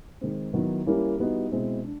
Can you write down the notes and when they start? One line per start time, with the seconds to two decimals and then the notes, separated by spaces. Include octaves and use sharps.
0.21 D#3 G#3 C4
0.53 D#3 F#3 B3 E4
0.86 E3 G3 A#3 C#4 E4
1.19 E3 G3 B3 D#4 F#4
1.51 B2 G#3 C4 E4
1.84 D4